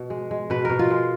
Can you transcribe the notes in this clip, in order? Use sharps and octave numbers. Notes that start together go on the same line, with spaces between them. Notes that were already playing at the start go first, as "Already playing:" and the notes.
Already playing: B2
G#3
G#3
B2 B4
B2 A#4
F4
G#3